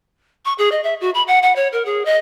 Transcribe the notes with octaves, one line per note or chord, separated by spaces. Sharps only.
C#6
G#4
D#5
E5
F#4
B5
F#5
F#5
C#5
A#4
G#4
D#5